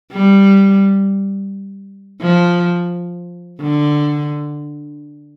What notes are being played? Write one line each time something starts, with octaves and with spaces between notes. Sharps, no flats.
G3
F3
D3